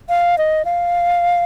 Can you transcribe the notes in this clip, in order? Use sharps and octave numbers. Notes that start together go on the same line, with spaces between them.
F5
D#5
F5